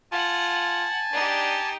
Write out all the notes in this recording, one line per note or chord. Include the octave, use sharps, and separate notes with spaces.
F4 F#5 G#5 A5
D4 D#4 G4